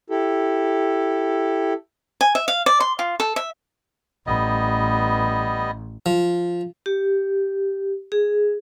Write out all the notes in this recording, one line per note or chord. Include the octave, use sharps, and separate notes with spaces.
E4 G4 A4
G#5
E5
F5
D5
C6
F4
A4
E5
A1 G3 B3 D#5
F3
G4
G#4